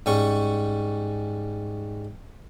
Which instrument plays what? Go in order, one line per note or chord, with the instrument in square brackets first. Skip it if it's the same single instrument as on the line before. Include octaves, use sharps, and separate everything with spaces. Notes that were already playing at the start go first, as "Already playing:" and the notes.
[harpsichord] G#2 G3 C#4 C#6